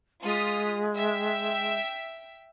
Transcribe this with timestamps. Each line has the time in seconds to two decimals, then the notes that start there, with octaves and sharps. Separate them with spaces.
0.24 G#3 F4 D#6 B6
0.95 E5 G5 B6